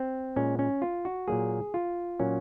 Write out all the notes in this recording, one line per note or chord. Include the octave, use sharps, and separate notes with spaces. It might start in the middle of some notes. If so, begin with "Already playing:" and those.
Already playing: C4
A#2 G#3 C#4
C#4
F4
F#4
A#2 F#3 A#3 G#4
F4
A#2 F#3 A#3 C#4